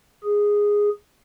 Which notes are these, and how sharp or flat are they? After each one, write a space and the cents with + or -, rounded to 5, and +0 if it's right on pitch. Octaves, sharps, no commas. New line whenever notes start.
G#4 -10